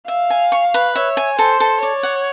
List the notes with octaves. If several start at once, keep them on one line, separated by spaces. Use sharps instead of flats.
E5 F5
G#5
C#6
B4
C#5 E5
G#5
A4 C5
A4
C#5 D5
F#5